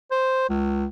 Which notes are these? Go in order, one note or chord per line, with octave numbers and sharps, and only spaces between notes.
C5
C#2